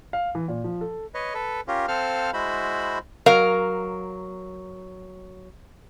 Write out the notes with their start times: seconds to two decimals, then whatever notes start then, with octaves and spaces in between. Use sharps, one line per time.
0.13 F5
0.35 E3
0.48 A#2
0.64 F3
0.81 A4
1.14 B4 C#5 D#5
1.34 A4 B4
1.68 C#4 F4 G4 A#4
1.88 C4 A4 C5 F5 F6
2.33 G#3 E4 F#4 C5 B5
3.26 F#3 A#4 F5